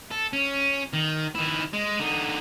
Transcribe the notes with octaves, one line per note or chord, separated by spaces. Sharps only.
A4
C#4
D#3
D#3 E4
G#3
D3 D#4